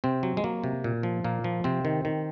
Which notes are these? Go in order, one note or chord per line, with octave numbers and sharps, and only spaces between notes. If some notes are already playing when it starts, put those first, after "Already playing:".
C3 C4
F#3
G#3
F#3 A#3
C3
A#2
F3
A#2 A#3
F3
C3 C4
D#3
D#3